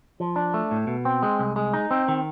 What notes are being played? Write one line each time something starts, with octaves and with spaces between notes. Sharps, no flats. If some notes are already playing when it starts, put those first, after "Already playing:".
F3
D4
A3
A2
B2
C4
G#3
C2
G#3
D#4
C4
D#3